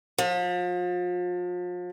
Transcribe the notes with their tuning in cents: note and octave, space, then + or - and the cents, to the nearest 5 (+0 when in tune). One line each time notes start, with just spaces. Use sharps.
F3 +35